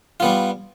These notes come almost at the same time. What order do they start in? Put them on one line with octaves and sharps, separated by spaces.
F4 B3 G3